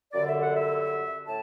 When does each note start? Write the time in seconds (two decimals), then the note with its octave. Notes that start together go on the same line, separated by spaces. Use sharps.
0.13 F#2 D3 G3 D5
0.28 E5
0.41 F#5
0.55 E5
1.27 A2 A5